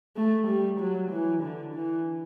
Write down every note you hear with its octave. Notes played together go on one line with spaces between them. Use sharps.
A3
G3
F#3
E3
D3
E3